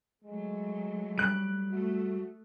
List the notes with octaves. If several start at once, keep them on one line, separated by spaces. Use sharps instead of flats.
F#3 G#3 A3
G3 F#6 D7
A3 F#4